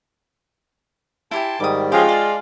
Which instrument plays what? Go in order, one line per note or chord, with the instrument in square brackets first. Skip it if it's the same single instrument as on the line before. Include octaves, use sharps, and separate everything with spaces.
[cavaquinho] E4 G4 G#5 [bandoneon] A5 C6
[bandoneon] G#2 D#3 G3 [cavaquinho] D6 D#6
[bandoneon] F3 C#4 G#4 [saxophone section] G#3 F4 [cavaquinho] G4 C#6
[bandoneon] D5 [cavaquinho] A5